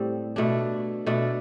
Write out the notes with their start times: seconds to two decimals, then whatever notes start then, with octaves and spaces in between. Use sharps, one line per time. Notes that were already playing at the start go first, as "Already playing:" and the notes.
Already playing: A2 G3 C4
0.36 B2 A3 D4
1.06 B2 A3 D4